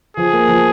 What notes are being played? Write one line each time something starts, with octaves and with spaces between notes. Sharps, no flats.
F3 G#4
A#3
F3